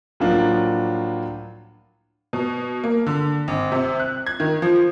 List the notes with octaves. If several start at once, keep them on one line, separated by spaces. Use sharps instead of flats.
A2 F3 F#3 A#3 D4 F4
B2
A#3
D3
G#1
C3
F#6
G#6
D#3
F3